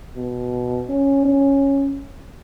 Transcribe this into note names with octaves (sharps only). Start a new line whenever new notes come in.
B2
C#4
C#4